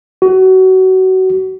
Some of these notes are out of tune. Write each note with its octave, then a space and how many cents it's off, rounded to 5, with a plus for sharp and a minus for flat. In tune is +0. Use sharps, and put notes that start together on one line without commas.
F#4 +25